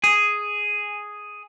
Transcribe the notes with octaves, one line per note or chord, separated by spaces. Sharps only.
G#4